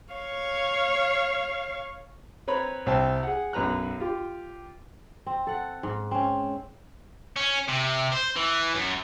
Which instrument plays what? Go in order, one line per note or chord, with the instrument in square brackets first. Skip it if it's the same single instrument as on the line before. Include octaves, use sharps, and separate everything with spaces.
[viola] C#5 F5
[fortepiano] C4 B4 C#5 A#5 B5
C2 C4 G5 A5
G#4 F#5
B1 F#2 B4 A#5 F#6
F4 G4
[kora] C4
A4 F#5
G#2
C4 C#4
[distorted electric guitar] C#4
C3
C5
E3
F#2